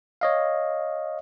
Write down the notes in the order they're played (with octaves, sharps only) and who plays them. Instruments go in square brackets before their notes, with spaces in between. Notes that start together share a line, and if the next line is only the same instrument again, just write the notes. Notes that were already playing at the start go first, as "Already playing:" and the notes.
[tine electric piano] C#5 D#5 F5